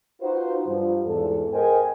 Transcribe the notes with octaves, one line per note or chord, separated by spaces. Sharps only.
D#4 F4 F#4 B4 C5
G2 F3
E2 G#2 A4
G#4 A#4 C5 D#5 G5 G#5